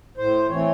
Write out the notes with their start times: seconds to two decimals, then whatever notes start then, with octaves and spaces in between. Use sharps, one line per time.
0.17 A2 C5
0.49 E3 A3 C4 C#5